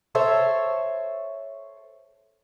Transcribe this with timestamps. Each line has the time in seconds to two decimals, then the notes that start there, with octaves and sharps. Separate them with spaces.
0.15 A4 C5 C#5 E5